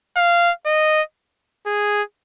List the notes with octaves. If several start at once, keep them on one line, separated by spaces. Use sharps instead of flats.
F5
D#5
G#4